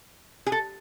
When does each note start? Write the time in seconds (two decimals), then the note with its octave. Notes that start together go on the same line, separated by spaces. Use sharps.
0.46 G#4
0.52 A4